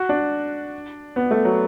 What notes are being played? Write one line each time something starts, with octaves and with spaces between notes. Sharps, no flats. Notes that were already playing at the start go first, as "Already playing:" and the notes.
Already playing: F#4
D4
B3
A3
F#3